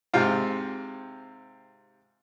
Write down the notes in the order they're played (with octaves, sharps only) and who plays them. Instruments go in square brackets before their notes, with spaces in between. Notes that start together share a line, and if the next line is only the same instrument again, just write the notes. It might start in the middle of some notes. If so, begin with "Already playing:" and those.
[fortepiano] G#2 C3 C4 F4